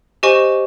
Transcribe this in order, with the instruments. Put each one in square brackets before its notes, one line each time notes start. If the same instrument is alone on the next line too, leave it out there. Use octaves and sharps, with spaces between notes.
[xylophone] G4 C5 D#5 G#5 C#6